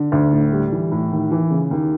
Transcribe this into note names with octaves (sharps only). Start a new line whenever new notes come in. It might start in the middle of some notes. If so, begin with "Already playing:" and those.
Already playing: D3
D2
A2
G3
E3
A2
D#2
E3
C#3
D#2